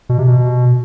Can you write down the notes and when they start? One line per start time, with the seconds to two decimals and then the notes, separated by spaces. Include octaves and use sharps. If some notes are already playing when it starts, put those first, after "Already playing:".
0.09 B2
0.19 C3
0.28 B2